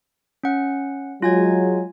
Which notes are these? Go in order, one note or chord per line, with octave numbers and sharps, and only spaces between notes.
C#4 F#5
F#3 G#3 F4 G#5 G#6